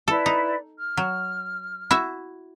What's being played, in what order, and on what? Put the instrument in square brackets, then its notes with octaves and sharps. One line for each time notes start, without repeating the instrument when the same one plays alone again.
[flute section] E4 B4 D5 [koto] A4
[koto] D#4
[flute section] F6
[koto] F#3
E4 F#4 E5